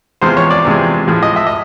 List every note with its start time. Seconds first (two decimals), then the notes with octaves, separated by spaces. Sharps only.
0.21 E2 C3 F3 G#3 C5
0.37 C#5
0.50 D5
0.65 E2 C3 F3 G#3
1.07 A2 F3 G#3
1.23 D#5
1.36 E5
1.47 D#5